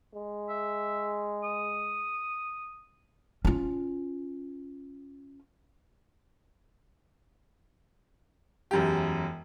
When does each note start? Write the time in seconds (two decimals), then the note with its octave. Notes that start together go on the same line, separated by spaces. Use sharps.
0.14 G#3
0.49 E5
1.44 D#6
3.45 C#4 F4
8.71 E1 F#2 G4